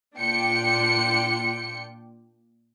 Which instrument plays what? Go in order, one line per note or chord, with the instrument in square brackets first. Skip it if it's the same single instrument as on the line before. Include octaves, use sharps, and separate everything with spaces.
[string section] A#2 D4 F4 G5 C#7